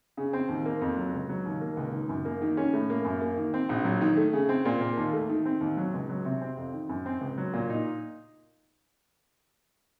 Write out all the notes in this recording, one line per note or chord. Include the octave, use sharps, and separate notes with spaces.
C#3
C4
D#2
A#3
F2
F#3
C#2
F#3
D#2
A#3
C#2
D#3
F#2
A#3
D#3
C#4
A2
A#3
F#2
A#3
D#3
C4
A#1
F#3
D#3
A3
C#3
C4
A#2
A#3
D#2
A3
D#3
C4
D#2
F#3
C#2
F#3
C3
C4
F2
D#3
F#2
C4
C#2
F#3
A#2
D#4